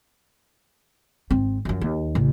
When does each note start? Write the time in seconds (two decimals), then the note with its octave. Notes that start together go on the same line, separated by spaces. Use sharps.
1.31 G#1 C4
1.65 F#2 F3
1.81 D#2
2.15 A1 C#3